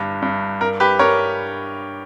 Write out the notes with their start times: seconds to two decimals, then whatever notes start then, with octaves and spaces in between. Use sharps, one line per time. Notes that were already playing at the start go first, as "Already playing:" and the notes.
Already playing: G1 G2
0.22 G2
0.61 G2 A#4
0.80 G4 B4
0.99 G2 A#4 C#5